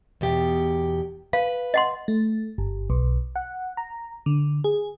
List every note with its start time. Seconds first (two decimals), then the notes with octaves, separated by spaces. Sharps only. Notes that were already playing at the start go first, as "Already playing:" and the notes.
0.21 E2 B2 G4
1.33 B4 F5
1.74 D#5 F#5 C6
2.08 A3
2.58 G1
2.90 B1
3.36 F#5
3.77 A#5
4.26 D3
4.64 G#4